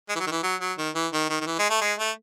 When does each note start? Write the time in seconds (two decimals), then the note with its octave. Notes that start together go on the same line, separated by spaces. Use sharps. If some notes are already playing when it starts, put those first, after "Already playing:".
0.09 G#3
0.16 E3
0.20 F#3
0.26 D#3
0.31 E3
0.43 F#3
0.61 F#3
0.78 D#3
0.95 E3
1.13 D#3
1.30 D#3
1.41 D#3
1.47 E3
1.59 G#3
1.70 A3
1.81 G#3
1.99 A3